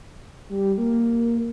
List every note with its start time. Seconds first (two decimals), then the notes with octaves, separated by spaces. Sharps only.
0.49 G3
0.78 A#3